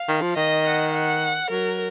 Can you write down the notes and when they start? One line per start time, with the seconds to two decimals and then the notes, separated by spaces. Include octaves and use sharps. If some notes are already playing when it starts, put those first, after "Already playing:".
Already playing: F5
0.08 D#3
0.22 F3
0.36 D#3 D#5
0.66 F#5
0.94 F#5
1.51 F#3 A#4